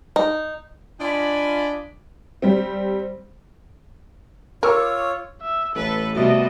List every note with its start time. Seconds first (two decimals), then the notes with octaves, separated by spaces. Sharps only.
0.16 D#4
1.01 D4 F4 D5 D#5 G#5 B5
2.42 G3 C4
4.63 F4 A#4 C#5 C#6 D6 E6
5.42 E5
5.75 A1 A4 B4
6.15 C3 G3 A3 B3 F#4 D#5 E5